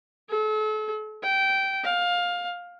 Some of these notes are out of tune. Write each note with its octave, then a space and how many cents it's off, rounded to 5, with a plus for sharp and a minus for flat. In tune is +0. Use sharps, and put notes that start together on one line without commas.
A4 -35
G5 -15
F5 +15